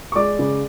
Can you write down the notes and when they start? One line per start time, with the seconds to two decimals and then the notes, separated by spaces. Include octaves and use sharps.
0.12 C#6
0.16 G#3 D5 D6
0.39 C#3